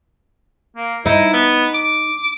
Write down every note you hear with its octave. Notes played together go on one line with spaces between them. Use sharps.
A#3
D#4 E4
B3
D6